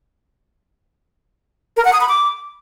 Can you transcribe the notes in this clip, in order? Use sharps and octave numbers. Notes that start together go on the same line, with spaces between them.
A#4
F#5
D#6
B5
D6